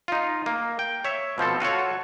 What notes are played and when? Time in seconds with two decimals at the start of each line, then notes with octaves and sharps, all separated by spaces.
0.08 D#4 F4
0.46 A#3
0.79 G5
1.05 C#5 E5
1.38 B2 F3 C4 A4
1.60 F4 F#4 A4 C#5